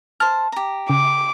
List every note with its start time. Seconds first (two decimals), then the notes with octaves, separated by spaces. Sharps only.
0.20 C5 A5 F6
0.52 G4 A#5
0.90 C#3 D6